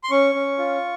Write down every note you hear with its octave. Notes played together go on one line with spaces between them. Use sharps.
C6
C#4 C#6
C#4
F4